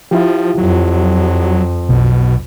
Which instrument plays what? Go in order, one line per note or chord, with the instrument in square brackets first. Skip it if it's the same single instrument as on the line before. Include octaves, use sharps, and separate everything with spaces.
[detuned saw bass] F3 [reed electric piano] E4 F4 G4
[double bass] F2 [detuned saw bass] F#3
[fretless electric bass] B1 [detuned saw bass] B2